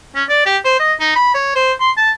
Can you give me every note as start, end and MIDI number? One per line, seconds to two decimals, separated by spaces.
0.15 0.24 61
0.29 0.45 74
0.46 0.57 67
0.64 0.78 72
0.79 0.93 75
1.00 1.14 63
1.16 1.33 83
1.34 1.55 73
1.55 1.72 72
1.80 1.90 84
1.97 2.11 81